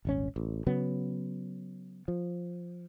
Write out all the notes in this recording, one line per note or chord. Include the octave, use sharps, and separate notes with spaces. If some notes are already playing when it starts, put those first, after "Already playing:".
D#1 G#1 C#4
A1
C#3 F#3 B3
F3